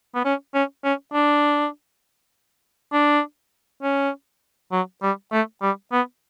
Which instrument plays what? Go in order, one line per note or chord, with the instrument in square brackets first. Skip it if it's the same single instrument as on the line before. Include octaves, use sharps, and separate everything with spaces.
[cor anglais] B3
C#4
C#4
C#4
D4
D4
C#4
F#3
G3
A3
G3
B3